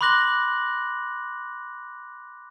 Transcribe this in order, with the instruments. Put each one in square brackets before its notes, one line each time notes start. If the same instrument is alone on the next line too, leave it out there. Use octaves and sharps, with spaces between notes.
[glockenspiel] B5 C6 D6 F#6 A#6 F#7